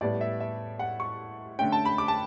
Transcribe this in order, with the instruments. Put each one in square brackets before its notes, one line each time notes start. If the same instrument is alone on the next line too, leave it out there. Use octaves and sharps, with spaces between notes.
[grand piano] A2 G3 B3 D5
E5
E5
F#5
C#6
D3 A3 C#4 G5
A5
B5
D6
A5